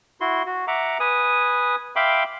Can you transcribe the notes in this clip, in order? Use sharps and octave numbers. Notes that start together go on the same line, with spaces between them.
E4 F#4 C6
F#4
E5 F#5 A#5 D6
B4 G#5 D#6
E5 F5 G5 B5 C6 D6